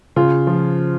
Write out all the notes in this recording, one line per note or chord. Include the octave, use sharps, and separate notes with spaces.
C#3 F4
F3